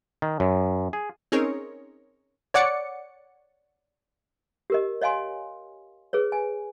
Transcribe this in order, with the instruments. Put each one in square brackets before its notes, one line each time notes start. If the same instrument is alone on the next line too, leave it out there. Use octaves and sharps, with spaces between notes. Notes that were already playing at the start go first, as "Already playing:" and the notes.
[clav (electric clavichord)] D#3
F#2
G#4
[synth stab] C4 C#4 D#4 G#4 A#4 C#5
[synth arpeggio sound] C#5 D5 F#5 D6 C#7
[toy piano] G4 A#4 D#5
C#5 D#5 F5 G#5 C6
G#4 B4 C#5
G#5